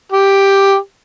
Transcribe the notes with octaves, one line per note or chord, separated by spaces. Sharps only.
G4